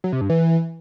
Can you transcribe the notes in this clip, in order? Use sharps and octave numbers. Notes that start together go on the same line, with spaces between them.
F#3
C3
G2
E3